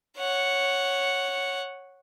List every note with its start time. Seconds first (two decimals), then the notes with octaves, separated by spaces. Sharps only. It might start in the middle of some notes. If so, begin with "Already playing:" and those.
0.18 C#5 F#5